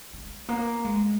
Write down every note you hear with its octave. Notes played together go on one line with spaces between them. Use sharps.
G#3
A#3
G#3